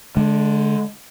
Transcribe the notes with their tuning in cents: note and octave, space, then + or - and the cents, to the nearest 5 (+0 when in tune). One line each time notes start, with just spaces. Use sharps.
D3 -5 G#3 +35